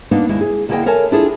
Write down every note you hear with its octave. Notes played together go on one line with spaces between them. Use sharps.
A#3 B3 D4 D#4
D#2 G#3 E4
G#4
D3 A#3 E4 G#4 D#5 G5
A4 A#4 C#5 E5 G#5 A5
D4 E4 F4 G#4 A4